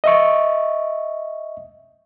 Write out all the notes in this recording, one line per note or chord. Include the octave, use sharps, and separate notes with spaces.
D#5 E5 C#6